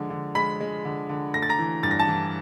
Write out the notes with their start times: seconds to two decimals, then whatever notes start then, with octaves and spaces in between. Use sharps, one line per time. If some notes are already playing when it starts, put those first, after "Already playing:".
Already playing: D3 F3 G#3
0.10 D3
0.35 G#3 B5 B6
0.61 G#3
0.85 D3
1.09 D3
1.33 A3 A#6
1.42 A6
1.50 A#5 A#6
1.59 E3
1.83 G2 A6
1.91 A#6
1.99 A5 A6
2.08 E3